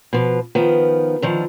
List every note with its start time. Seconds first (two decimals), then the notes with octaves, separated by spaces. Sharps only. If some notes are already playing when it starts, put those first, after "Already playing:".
0.13 B2 F3
0.55 D#3 F3 B3
1.22 D3 D#3 F3